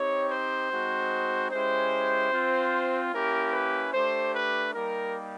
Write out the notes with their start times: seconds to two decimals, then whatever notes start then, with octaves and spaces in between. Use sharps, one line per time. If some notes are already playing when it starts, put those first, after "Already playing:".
Already playing: C4 D#4 G4 C#5
0.30 C5
0.70 G#3 C4 D#4 F#4
1.51 G#3 C#4 E4 G4 C5
2.31 C4 F4
3.12 A#3 C#4 E4 G4 A#4
3.52 B4
3.93 A3 D4 G4 C5
4.34 B4
4.74 G3 A#3 D#4 G4 A#4